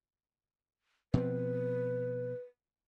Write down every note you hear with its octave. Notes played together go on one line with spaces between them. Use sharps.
B2 F3 C4 B4